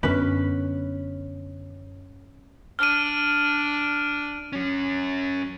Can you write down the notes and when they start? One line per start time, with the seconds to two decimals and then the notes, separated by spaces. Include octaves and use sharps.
0.03 F#2 D3 F#3 B3 C#4 B4
2.79 D4 F6 D#7
4.53 F#3 C#4